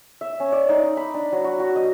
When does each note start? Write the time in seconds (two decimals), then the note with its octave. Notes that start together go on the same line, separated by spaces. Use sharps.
0.21 E5
0.40 C#4
0.52 D5
0.69 D#4
0.83 D#4
0.97 B5
1.14 D4
1.32 F#3
1.44 F#4
1.60 F#4
1.76 D#5